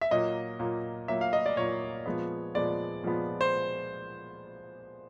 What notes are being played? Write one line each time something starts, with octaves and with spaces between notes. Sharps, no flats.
E5
A#2 F#3 A#3 D#5
A#2 F#3 A#3
A#2 F#3 A#3 E5
F5
D#5
D5
A#2 F#3 A#3 C#5
A#2 F3 G#3 B3
A#2 F3 G#3 B3 D5
A#2 F3 G#3 B3
C5